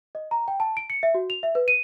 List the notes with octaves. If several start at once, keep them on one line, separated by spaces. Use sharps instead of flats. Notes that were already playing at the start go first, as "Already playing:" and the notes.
D#5
A#5
G5
A5
D7
C#7
E5
F#4
F7
E5
B4
D#7